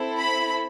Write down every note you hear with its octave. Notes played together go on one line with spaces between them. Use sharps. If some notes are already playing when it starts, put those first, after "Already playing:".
Already playing: C4 E4 A4
B5